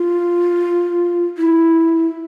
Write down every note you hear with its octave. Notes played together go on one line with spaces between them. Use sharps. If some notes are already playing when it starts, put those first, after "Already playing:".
Already playing: F4
E4